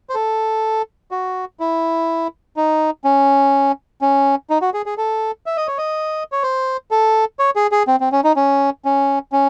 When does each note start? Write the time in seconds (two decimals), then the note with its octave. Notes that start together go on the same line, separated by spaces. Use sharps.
0.09 C5
0.15 A4
1.11 F#4
1.60 E4
2.57 D#4
3.04 C#4
4.02 C#4
4.50 D#4
4.62 F#4
4.74 G#4
4.86 G#4
4.98 A4
5.46 E5
5.57 D#5
5.67 C#5
5.78 D#5
6.32 C#5
6.43 C5
6.91 A4
7.39 C#5
7.56 G#4
7.72 G#4
7.88 C4
8.00 C4
8.12 C#4
8.24 D#4
8.36 C#4
8.85 C#4
9.32 C#4